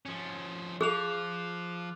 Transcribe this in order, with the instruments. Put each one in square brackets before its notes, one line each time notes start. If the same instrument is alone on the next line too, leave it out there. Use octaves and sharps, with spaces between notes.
[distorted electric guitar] F3 C#4
[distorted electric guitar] F3 [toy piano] G#4 [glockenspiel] D6 F#6 F7